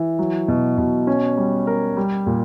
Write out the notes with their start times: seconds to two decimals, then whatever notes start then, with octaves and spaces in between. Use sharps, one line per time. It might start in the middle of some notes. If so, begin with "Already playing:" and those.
Already playing: E3
0.19 F#3
0.48 B2
0.78 B2
1.07 C#4
1.37 G3
1.67 A#4
1.97 G3
2.26 A#2